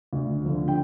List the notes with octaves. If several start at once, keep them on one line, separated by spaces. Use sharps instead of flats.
D2
D3 F3
G5